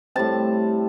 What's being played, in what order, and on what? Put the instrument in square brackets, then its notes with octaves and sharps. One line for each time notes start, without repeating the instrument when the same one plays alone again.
[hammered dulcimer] A2 G3 C4 A5